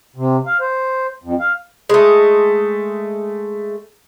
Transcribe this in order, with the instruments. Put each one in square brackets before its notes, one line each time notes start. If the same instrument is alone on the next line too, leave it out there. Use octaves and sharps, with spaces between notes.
[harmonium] C3
F5
C5
F2
F5
[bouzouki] G#3 A3